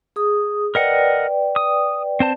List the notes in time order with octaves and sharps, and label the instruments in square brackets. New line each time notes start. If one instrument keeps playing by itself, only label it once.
[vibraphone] G#4 D#6
[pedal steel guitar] A#4 D#5 F#5 [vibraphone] B4 D5 G5
[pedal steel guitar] D#6
C4 C5 A5